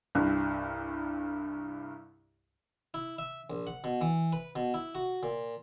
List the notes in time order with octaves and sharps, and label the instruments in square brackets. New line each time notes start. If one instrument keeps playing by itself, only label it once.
[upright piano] C2 G2
[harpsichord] E4
E5
A#1
F#5
B2
E3
B4
B2
E4
F#4
A#2